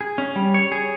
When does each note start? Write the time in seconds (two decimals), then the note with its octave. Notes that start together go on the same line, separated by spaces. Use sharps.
0.01 G#4
0.18 C#4
0.36 G3
0.54 C#5
0.72 G#4